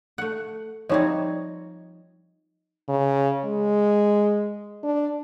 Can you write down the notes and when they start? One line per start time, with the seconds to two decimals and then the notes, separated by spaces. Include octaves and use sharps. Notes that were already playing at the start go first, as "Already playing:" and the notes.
0.18 A3 F#5
0.89 F3 G3 C4 D#4 C#5 D#5
2.88 C#3
3.44 G#3
4.83 D4